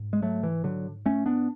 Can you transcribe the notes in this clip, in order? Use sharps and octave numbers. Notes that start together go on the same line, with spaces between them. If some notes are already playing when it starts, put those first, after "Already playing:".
Already playing: G#2
G#3
F#3 A3
E3
D3 F#3
A3 C#4
B3 D4